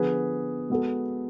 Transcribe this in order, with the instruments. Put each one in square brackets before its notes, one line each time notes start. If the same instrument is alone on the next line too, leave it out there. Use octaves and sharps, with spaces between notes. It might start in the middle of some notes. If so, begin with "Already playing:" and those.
Already playing: [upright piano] D3 F3 B3 [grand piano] G#4 B4
[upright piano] G#3 B3 F#4 A4